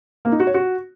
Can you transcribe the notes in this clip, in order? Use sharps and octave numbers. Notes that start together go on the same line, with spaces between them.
A#3
D#4
F#4
C#5
F#4